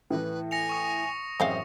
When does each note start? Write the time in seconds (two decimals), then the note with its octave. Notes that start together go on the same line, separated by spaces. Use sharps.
0.10 A2 E3 B4
0.51 G#5 A#6 C#7 F7
0.69 C#6 D#6 C#7
1.40 A1 F#2 G#3 C4 C5 E5 F5